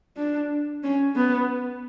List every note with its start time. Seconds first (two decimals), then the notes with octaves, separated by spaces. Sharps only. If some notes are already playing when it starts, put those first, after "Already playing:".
0.17 D4
0.83 C#4
1.15 B3